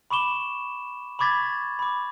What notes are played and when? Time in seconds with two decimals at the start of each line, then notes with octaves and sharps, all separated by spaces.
0.11 B5 C#6 D6 E7 G7
1.19 B5 C#6 D6 G#6 A6 B6
1.79 B5 D6